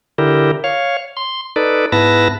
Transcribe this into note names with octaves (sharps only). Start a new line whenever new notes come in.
D3 E4 G4 A#4
C#5 F5
C6
D#4 A4 B4 D5
G#2 B3 E4 B4 A5 A#6